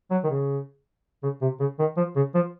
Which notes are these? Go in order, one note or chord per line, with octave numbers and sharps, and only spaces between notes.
F#3
D#3
C#3
C#3
C3
C#3
D#3
F3
C#3
F3